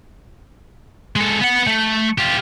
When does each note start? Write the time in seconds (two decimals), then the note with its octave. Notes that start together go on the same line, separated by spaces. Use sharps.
1.16 G#3 A4
1.41 B3 F#5
1.67 A3
2.18 F4 G4